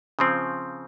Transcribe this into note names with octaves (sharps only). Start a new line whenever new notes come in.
C#3 F3 C4